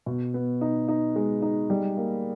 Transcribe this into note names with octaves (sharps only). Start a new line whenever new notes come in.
B2
B3
D#4
D#4
G#3
D#4
G3
A#3